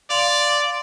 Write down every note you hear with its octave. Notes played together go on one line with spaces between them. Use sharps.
D5 F5 C6